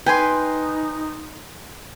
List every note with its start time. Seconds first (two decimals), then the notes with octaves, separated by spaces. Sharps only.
0.06 D#4 B4 G5 G#5 C6